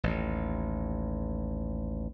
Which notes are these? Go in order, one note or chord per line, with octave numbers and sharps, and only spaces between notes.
A1 D#2